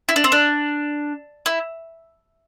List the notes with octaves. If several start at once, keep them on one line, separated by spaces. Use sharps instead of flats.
E4
D4
C4
D4
E4